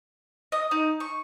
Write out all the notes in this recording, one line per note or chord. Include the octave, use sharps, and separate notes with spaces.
D#5
D#4
C#6